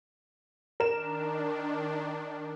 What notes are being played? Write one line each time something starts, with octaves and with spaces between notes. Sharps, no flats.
D#3 D4 A#4 E7